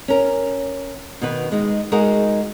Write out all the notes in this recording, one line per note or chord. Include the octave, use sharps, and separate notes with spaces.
C#4 A#4
B2 D#3 B4
G#3 D#4
G#3 D#4 F#4 G#4 A#4